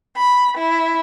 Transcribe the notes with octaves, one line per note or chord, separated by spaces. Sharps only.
B5
E4